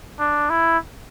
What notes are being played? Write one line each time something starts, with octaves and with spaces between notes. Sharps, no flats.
D4
E4